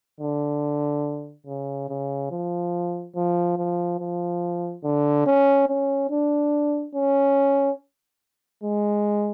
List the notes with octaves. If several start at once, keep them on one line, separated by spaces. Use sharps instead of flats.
D3
C#3
C#3
F3
F3
F3
F3
D3
C#4
C#4
D4
C#4
G#3